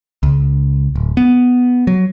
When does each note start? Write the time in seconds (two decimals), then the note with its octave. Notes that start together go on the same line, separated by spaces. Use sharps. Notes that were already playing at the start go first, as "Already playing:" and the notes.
0.23 C#2
0.95 D1
1.17 B3
1.87 F#3